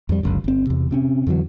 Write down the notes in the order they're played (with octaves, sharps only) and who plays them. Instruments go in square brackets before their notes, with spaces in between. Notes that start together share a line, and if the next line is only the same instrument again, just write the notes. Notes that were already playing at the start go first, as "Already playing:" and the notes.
[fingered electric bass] F2 F3 G3
G1 C#2 F#2
G1 C4
E2 C3
C3 C4 C#4
F2 D3 E3 F#3